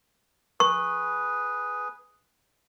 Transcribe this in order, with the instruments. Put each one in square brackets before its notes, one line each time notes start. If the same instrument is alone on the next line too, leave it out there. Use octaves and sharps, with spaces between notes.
[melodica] G#4 B4 [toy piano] C#6